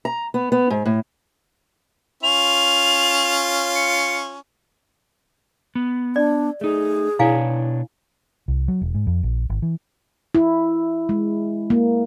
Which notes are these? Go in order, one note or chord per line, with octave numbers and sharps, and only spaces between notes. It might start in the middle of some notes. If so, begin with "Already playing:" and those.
A#5
B3
B3
G#2
A2
C#4 F4 F7
C#7
B3
D4 D5
A3 D#4 G#4
B2 D4 E4 C#5 F5 G#5
C2
F#3
E1
G#2
F2
A#1
G#1
E3
E4
G#3
A#3